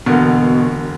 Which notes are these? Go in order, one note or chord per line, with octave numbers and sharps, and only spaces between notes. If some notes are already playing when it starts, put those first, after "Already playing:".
E1 B2 D3 A#3